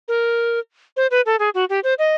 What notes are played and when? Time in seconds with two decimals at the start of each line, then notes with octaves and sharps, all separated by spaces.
0.08 A#4
0.97 C5
1.11 B4
1.26 A4
1.39 G#4
1.54 F#4
1.69 G4
1.84 C5
1.99 D#5